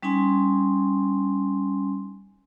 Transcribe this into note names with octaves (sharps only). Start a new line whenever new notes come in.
G3 C#4 D#4 G#5 C6